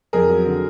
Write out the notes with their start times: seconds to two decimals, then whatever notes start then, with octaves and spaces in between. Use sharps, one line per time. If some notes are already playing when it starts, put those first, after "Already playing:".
0.13 F2 G#4 A#4
0.30 F#3
0.46 D3